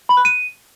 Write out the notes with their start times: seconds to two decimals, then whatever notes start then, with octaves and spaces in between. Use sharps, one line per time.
0.09 B5
0.17 F#6
0.25 D#7